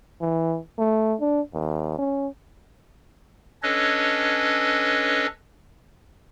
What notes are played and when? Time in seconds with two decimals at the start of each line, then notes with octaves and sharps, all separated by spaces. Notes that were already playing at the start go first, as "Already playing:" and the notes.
0.21 E3
0.78 A3
1.21 D4
1.54 D#2
1.99 C#4
3.63 C#4 D4 A4 B4 C#5 D#5